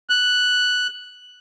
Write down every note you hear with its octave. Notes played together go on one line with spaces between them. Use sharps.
F#6